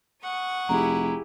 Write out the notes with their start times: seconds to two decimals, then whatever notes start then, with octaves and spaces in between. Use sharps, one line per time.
0.23 F#5 C#6 D#6
0.69 F1 E4 G4 G#4 A#5